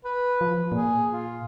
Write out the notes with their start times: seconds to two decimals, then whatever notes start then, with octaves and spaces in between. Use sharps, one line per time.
0.04 B4
0.41 F3
0.72 A#2 G#4
1.12 F4